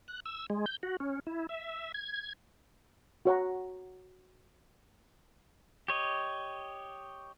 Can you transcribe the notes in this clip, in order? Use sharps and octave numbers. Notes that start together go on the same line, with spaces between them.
F#6
E6
G#3
G6
F#4
C#4
E4
E5
G#6
F#4 C#5 F#5 A#5
G4 C#5 D#5